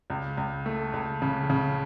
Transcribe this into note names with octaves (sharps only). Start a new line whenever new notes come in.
C#2
C#2
A3
C#2
C#3
C#3